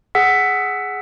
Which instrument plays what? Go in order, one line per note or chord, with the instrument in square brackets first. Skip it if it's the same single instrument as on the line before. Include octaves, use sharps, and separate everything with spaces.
[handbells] G#4 F#5 E6 B6